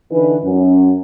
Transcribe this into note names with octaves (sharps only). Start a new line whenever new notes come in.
D3 E3 D#4 B4
F#2 C#4